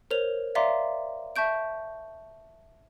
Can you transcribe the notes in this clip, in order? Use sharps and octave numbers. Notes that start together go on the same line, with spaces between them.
A#4 C5 C#5 F7
D5 E5 F5 A#5 C6 D6
E5 A5 C#6 G6 D7